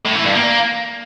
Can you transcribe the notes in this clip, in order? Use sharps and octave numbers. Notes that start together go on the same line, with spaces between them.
A2
E3
G2
A#3